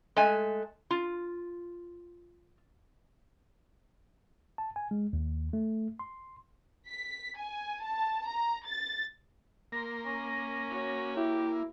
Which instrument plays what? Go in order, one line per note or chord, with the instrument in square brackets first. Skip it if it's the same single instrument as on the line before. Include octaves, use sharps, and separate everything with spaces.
[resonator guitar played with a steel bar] G#3 A3 G#5
F4
[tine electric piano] A5
G#5
G#3
D#2
A3
C6
[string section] B6
G#5
A5
A#5
A6
[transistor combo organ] A#3 [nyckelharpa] A#4 C6 [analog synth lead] A#6
[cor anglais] C#4
[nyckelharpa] F#4 C#5
[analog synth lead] E4 [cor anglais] G4